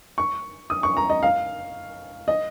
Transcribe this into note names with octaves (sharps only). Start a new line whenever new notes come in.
C#6
D#6
C#6
A#5
D#5
F5
D#5